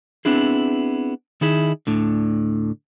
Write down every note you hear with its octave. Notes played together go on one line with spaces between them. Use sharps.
B3 C4 D4 E4 G#4
D#3 D#4 E4 G#4 E5
D2 A2 D3